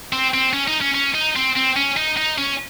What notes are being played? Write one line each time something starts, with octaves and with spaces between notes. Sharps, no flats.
C4
C4
C#4
D#4
C#4
C#4
D#4
C4
C4
C#4
D#4
D#4
C#4